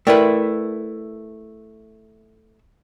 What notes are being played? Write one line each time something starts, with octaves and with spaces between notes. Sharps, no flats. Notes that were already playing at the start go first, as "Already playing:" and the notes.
A3 E4 A#4 B4 D5 G5